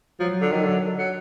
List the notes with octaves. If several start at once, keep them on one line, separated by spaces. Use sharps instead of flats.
F3 F#3
D3
D#3 F#3
D3
F#3